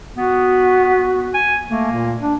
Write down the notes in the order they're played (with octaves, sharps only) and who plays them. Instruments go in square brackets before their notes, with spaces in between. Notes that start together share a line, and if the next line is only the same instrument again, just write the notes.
[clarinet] B3 [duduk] F#4
[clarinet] G#5
[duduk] A3 [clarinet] A#3
[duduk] A#2
D4